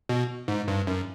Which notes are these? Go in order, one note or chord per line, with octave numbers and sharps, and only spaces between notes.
B2
G#2
G2
F#2